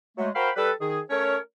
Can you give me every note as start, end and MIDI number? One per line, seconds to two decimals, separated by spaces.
0.18 0.30 54
0.18 0.30 56
0.18 0.30 57
0.35 0.50 66
0.35 0.50 70
0.35 0.50 72
0.35 0.50 77
0.35 0.50 79
0.35 0.50 83
0.56 0.71 55
0.56 0.71 69
0.56 0.71 71
0.81 1.00 51
0.81 1.00 68
1.10 1.37 57
1.10 1.37 61
1.10 1.37 70
1.10 1.37 73